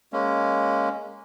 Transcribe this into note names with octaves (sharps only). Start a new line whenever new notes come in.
G#3 A#3 C#4